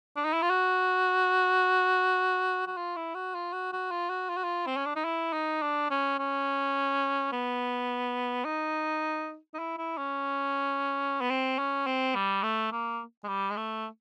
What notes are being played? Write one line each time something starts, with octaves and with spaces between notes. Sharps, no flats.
D4
D#4
E4
F4
F#4
F#4
F4
E4
F#4
F4
F#4
F#4
F4
F#4
F4
F#4
F4
C4
C#4
D4
D#4
E4
D#4
D4
C#4
C#4
B3
D#4
D#4
E4
E4
C#4
B3
C4
C#4
C4
G3
A3
A#3
G#3
G3
G#3
A3